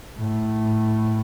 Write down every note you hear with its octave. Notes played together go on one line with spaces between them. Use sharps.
A2